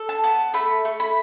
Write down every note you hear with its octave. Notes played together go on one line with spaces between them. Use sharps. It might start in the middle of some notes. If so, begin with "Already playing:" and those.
Already playing: A4
A5
B3
A3 B5
A3
B5